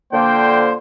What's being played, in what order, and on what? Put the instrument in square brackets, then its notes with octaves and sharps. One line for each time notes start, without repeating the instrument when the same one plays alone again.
[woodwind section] D3 F3 A#3 [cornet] C5 [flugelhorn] G5